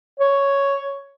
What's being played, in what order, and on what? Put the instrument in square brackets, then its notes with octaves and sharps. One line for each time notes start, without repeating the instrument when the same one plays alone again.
[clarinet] C#5